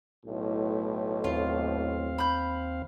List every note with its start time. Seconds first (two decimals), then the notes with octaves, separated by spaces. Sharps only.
0.25 B1 A2
1.24 D#2 C4 F4 F5
2.18 B5 G6